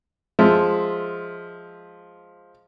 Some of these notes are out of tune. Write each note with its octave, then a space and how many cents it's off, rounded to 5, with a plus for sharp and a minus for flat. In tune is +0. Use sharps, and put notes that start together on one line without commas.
F3 +0 G#3 +0 E5 +0